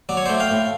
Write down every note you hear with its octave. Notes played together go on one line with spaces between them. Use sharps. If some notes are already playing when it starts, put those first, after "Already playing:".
F#3 D5
C#5
A3 C5 D5
F5 G5
A2